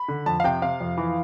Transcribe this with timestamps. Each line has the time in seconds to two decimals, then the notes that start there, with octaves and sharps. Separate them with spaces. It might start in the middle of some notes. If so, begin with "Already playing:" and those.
Already playing: B5
0.08 D3
0.26 F2 A5
0.40 F5
0.44 C3 G5
0.62 C3 F5
0.80 F2
0.98 E3